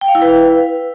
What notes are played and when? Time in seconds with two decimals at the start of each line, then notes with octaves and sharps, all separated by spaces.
0.01 G5
0.08 F5
0.15 E4
0.22 B4